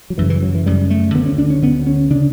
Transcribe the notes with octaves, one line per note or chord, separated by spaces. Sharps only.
F#3
F#2 C#3 E3
E3
F#3
E3
F#2 C#3 G3
A3
D2 D3 B3
C#4
D4
C#4
D2 D3 B3
C#4
C#3 D4